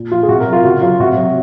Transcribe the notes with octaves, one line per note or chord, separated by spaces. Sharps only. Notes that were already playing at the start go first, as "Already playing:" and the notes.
Already playing: A#2
F3 F4
G#4
C3 F#4
A#4
F#3
F4
C#3 F#4
F#3 F4
C3 F#4
F#3